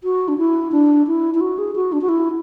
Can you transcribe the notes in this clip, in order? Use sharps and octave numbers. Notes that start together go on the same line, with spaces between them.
F#4
D4
E4
D4
E4
E4
F#4
G#4
F#4
D4
F#4
E4